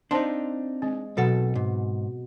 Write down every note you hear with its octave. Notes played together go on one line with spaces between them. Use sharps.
C4 D4 D#4 C5 F5 A5 C6
G#3 C4
B1 B2 F#3 A4 F#5
G#2